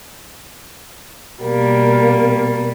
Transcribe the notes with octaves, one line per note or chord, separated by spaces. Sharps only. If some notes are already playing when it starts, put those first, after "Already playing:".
B2 G3 A#3